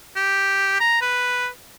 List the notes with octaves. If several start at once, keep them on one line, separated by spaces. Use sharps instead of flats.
G4
A#5
B4